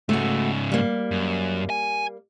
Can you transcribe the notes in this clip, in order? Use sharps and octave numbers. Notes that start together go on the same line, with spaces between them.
G#2 C#3 A3 F#4
G3 A#3
F#2
G#5